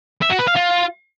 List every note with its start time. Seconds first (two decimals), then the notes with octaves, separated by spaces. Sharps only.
0.22 E5
0.31 F#4
0.39 B4
0.48 F5
0.56 F4